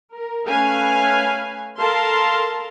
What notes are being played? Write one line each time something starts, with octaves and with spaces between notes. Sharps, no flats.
A#4
A3 C#4 B4 F5 G#5
A4 A#4 F5 A5 C6